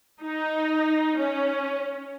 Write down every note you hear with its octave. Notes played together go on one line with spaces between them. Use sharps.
D#4
C#4